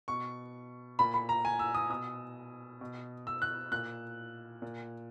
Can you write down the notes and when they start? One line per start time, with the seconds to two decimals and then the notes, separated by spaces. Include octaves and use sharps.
0.08 B2 C#6
0.99 A#2 B5
1.14 B5
1.29 A#5
1.45 G#5
1.59 E6
1.75 D#6
1.90 B2 D#6
2.81 B2
3.27 E6
3.42 F#6
3.72 A#2 F#6
4.62 A#2